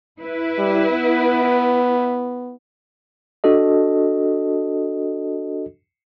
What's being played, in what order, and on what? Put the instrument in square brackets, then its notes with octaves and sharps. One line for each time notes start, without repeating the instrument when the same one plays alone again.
[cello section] E4 B4
[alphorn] G3
B3
[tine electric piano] D4 F#4 A4 D#5